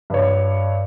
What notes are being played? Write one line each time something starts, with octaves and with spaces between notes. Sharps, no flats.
G2 C#5